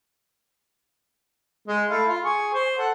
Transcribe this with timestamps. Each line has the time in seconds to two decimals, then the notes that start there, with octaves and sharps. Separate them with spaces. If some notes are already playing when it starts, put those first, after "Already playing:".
1.68 G#3
1.90 A3 E4 F5
2.08 F4
2.24 G#4 C#6
2.54 C5
2.78 A4 F#5